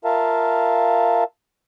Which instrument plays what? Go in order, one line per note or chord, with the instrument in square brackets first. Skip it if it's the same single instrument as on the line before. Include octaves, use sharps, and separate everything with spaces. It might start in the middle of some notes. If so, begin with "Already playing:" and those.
[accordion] F4 A#4 E5 F5 A5